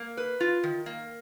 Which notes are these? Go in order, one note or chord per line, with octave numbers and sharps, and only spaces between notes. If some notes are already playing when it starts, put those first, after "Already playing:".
Already playing: A#3
B4
F4
D#3
A#3